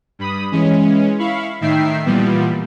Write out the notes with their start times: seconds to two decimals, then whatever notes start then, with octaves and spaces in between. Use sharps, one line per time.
0.19 G2 B5 D#6
0.52 E3 G#3 C#4
1.19 E4 F5 B5 C#6
1.61 A2 D#3 D#4 E5 G5 C7
2.06 A#2 E3 F3 G3 B3